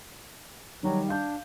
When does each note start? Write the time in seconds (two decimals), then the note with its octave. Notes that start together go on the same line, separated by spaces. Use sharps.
0.83 D#3 F#3 G3
1.08 D4 F5 G6